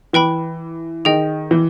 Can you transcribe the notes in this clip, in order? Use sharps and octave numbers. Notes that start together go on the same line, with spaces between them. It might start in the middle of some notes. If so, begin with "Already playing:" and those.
E3 B4 G5 B5
D#3 G#4 D#5 G5
E3